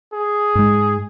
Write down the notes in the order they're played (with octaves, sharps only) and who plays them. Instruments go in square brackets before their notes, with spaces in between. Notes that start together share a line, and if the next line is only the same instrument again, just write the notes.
[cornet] G#4
[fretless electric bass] G#2 G#3